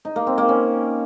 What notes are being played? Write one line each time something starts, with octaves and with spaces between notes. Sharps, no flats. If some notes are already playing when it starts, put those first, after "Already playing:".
D#4
A#3
C4
A#3
C#4